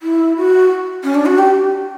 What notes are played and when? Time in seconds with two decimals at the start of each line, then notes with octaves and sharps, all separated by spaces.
0.02 E4
0.37 F#4
1.03 C#4
1.14 D4
1.26 F#4
1.38 G4